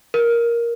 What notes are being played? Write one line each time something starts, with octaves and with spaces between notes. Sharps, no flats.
A#4